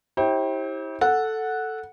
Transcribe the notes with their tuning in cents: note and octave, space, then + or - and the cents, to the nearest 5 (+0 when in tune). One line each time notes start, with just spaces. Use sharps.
E4 -40 G4 +0 C5 +40
A4 +0 F#5 -5